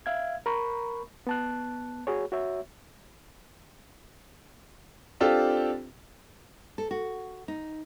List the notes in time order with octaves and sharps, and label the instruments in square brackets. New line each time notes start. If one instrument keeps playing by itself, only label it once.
[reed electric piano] E5 F5 G#6
A#4 A#5 B5 C#6
B3 A5 F#6
F#4 G#4 C#5
F#4 C#5 E5
[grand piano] C4 D4 F4 G4 A4
[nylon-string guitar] A4
F#4
D#4